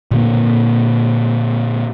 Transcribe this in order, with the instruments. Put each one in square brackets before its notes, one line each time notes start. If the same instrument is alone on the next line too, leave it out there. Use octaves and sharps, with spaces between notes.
[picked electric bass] A#2 D3 A#3